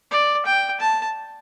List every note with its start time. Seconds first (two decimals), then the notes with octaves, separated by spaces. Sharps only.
0.11 D5
0.46 G5
0.80 A5